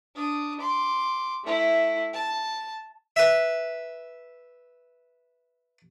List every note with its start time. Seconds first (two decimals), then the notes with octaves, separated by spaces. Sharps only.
0.15 D4 D#6
0.60 C6 D6
1.44 A3 E4
2.13 A5
3.16 B4 E5